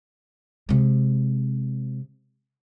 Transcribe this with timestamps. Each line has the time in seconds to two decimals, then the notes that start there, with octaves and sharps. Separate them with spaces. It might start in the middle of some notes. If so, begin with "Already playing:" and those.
0.69 C3 G#3